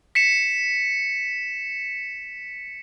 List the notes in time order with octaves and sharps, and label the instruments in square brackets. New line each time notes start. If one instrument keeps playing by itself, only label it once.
[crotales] B6 C#7 E7